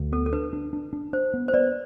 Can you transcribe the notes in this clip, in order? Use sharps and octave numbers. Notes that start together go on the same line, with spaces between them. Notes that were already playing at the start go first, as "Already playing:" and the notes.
Already playing: D2
B3 A4
A4
D4 B4
D4
D4
D4
D4 C5
B3
C5
B3 B4 D5